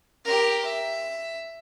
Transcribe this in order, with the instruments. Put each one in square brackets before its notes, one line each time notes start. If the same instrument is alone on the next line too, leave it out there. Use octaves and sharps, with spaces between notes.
[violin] G4 A#4
E5